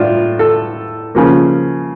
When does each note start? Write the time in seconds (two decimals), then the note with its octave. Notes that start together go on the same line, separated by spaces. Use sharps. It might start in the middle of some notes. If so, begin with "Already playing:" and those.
Already playing: A2 D4 F4
0.39 A4
1.15 C#3 F3 A#3